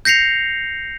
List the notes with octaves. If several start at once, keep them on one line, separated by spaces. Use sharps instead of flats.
G6 A#6 C7 C#7 F7